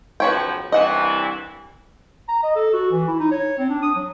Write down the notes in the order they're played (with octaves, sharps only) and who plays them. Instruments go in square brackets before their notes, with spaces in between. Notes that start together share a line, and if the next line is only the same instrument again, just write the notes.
[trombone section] B1 C#3 F3 [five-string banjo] B4 C#5 G5
[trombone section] C2 G2 E3 [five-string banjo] D#5 F#5
[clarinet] A#5
D#5
A4
F#4
E3
E4
D#4
C#5
C4
D4
D#6
F#3